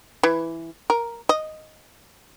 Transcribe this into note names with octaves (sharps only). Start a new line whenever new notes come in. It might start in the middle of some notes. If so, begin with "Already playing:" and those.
E3
A#4
D#5